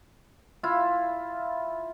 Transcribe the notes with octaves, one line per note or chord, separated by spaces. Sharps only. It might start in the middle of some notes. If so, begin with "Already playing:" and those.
E4 F4